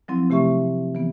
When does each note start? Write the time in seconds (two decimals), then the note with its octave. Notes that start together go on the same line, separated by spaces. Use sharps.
0.08 F3 F#3 C4 E4
0.30 C3 A3 G4 E5 C#6
0.95 E3 B3